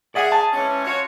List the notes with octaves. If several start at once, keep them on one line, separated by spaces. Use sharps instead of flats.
G#4 D5 E5 F#5
A5
E3 G#3 C#4
F4 F#4 C#5